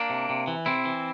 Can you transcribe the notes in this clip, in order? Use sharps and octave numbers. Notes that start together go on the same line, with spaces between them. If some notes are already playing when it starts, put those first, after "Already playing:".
Already playing: A#3 D4
C3
C3
E3
C3 C4 E4
E3